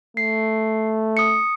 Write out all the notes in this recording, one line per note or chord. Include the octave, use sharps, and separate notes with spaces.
A3 C7
D#6 C#7